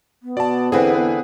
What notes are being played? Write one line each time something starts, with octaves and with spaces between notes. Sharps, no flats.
B3
B2 D5 A5
E2 D3 C4 G#4 B4